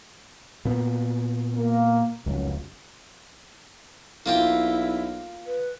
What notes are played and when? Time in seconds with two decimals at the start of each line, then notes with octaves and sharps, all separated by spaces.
0.65 A#2 B3
1.55 A#3
2.26 F1 C#2 F#2
4.26 B1 A#3 E4 F4 G4
5.47 B4